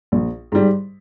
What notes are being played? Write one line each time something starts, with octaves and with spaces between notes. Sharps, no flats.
A#1
G#2 G3